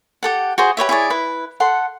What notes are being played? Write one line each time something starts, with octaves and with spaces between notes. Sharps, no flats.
G4 A4 F#5
F#4 G#4 C5
G4 B4 C#5 E5
E4 G#4 C#5 D5
E4 B4
A4 F#5 C6